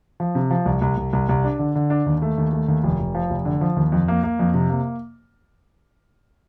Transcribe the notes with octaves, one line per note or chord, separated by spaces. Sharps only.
F3
C3
F3
C2
C2
C2
C2
C2
D4
D3
D3
D4
D#2
A3
D#2
A3
D#2
F1
F1
F3
F1
D3
F3
D#2
F2
A#3
A#3
F2
C3
A#3